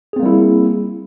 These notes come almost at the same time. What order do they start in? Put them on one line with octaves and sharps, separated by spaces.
G#4 C4 A#3 G3 E4